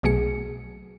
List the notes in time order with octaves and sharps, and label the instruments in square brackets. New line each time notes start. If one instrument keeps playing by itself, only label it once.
[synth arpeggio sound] B1 B2 F#3 A3 G#4 C#7